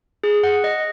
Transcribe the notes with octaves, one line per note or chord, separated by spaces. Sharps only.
G#4
F#5
D#5